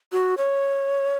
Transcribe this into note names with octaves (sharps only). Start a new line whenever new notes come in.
F#4
C#5